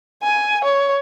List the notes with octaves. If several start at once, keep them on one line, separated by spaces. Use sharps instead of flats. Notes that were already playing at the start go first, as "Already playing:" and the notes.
G#5
C#5